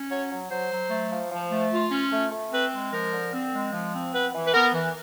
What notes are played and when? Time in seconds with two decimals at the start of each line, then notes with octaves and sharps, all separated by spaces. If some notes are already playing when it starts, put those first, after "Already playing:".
Already playing: C#4
0.10 F#3 C#5
0.30 F#3
0.50 F#3 C5
0.70 F#3
0.90 A3
1.11 F3
1.31 F3
1.51 A3
1.71 F4
1.91 C#4
2.12 A3
2.31 A3
2.52 C4 B4
2.72 G#3
2.92 F3 A#4
3.13 D3
3.33 C4
3.53 G#3
3.73 F3
3.93 C4
4.13 B3 B4
4.34 E3
4.47 B4
4.53 B3 A#4
4.73 E3